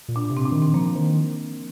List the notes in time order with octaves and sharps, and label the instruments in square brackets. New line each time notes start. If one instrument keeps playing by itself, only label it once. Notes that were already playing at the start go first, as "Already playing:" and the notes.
[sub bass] A#2
[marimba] D4
[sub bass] C3
[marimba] C4
D4
[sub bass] D#3
[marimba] C4
[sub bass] F3 [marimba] A#3
[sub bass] D#3